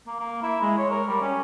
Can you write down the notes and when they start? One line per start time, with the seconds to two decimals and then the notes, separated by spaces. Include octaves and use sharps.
0.07 A#3
0.20 A#3
0.43 E4
0.61 G#3
0.78 C#5
0.91 A#4
1.08 G3
1.21 C#4